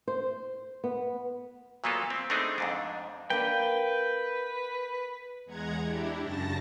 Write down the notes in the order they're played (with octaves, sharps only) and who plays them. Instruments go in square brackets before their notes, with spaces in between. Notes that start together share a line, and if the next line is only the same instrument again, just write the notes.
[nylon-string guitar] C5
B3
[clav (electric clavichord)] A#2 F#3 A#3 B3 F4 A4
C4
A3 B3 C4 D4 D#4 G#4
F2 G#2 D4
[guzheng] A#3 D4 E5 [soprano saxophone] B4 [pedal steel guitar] G5
[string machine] E2 G#3 F#5 A#5 G#6
D4 E4 G4
F#2 C#3 A5 A6 A#6